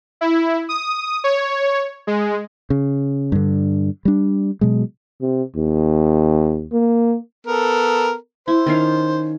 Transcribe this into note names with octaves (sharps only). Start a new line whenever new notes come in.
E4
D#6
C#5
G#3
C#3
G2 D3
G3 D4
B2 F#3 G#3
C3
D#2
A#3
B3 A4 A#4
E4 C5
D#3 C#4 F5